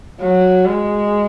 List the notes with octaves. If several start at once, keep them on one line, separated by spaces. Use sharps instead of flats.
F#3
G#3